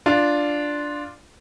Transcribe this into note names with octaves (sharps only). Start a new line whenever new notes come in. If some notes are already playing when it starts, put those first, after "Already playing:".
D4 F4